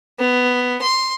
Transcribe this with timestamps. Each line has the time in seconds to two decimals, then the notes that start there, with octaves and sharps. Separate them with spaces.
0.19 B3
0.82 C6